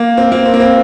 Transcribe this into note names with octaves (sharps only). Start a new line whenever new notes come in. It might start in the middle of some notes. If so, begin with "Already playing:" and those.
Already playing: A#3
C4
A#3
C4
A#3
C4